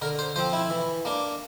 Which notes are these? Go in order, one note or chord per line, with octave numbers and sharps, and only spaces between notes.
D3 A#4
C5
F3 C4 C5
E4
E3
A#3 D4